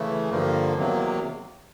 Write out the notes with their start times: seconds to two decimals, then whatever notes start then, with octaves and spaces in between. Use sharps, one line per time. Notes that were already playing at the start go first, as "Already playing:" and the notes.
Already playing: C#3 E3 A3
0.30 G2 D3 F3 A#3
0.75 E2 C3 D#3 F#3 A#3